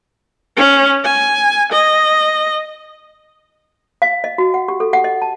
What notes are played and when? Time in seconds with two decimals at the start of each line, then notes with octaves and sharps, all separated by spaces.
0.57 C#4
1.05 G#5
1.72 D#5
4.02 F5
4.24 D#5
4.38 F#4
4.54 F#5
4.68 G4
4.80 A4
4.93 F#5
5.04 D#5
5.22 A5